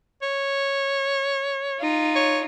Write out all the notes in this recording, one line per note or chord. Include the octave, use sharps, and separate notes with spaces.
C#5
D#4 F4
C#5